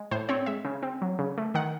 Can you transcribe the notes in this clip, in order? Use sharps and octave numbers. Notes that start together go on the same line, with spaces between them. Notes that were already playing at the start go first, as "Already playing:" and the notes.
Already playing: G#3
A2 C5
C4 C#5
G#3 E5
C#3
C4
F#3
C#3
A3
D#3 F#5